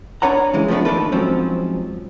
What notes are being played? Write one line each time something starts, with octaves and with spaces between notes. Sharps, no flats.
D4 B4 C#5 F#5 A#5
C#3 E3 G#3
F3 G3 A3 B3 D4
D#2 D4 D#4 A4 B4
G#2 F3 F#3 C4 C#4